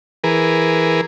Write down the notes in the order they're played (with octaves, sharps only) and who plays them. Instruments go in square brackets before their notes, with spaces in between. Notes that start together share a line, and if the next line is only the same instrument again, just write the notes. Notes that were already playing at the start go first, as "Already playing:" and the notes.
[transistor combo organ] E3 G#4 A#4 B4